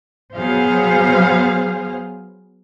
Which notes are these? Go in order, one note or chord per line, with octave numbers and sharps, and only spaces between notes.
F#3 B3 G#4 C5 F5